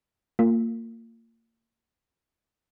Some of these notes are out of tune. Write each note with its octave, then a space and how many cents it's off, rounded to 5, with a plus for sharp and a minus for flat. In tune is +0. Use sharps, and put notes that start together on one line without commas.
A#3 -30 F4 +0